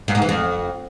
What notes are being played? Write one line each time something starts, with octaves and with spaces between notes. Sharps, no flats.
G2
G#2
E3
F2